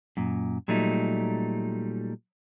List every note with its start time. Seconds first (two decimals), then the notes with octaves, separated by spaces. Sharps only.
0.17 F#2 A#2
0.68 A#2 F#3 G3 A3 D#4